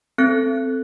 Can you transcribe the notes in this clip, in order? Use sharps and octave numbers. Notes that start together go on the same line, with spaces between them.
C4 A4 F#6